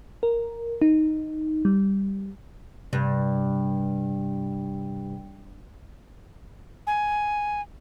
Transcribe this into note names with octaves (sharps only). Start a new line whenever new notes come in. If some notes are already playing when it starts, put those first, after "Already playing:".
A#4
D#4
G3
G2 C3
G#5